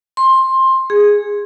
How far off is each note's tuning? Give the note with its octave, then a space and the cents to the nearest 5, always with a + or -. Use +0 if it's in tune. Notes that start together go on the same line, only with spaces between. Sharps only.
C6 +15
G#4 -10